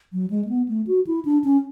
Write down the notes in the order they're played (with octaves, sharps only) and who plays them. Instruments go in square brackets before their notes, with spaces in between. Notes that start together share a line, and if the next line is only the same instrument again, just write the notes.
[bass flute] F#3
G#3
A3
B3
A3
F#4
E4
D4
C#4